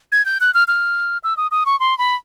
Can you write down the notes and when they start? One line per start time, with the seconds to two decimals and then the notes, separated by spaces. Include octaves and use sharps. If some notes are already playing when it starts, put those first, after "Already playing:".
0.12 G#6
0.26 G6
0.41 F#6
0.54 F6
0.68 F6
1.24 E6
1.37 D#6
1.51 D#6
1.66 C#6
1.80 C6
1.98 B5